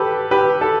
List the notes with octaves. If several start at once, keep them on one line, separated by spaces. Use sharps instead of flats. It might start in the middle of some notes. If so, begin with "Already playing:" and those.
Already playing: G4 A4 B4
G4 B4
A4